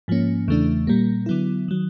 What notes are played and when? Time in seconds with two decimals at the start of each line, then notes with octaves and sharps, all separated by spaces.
0.08 G#2 F3 A#3 C#4
0.48 E2 C#3 E3 A3 D4
0.87 A#2 G3 A#3
1.26 D3 F#3 B3 E4
1.68 D#3 F#3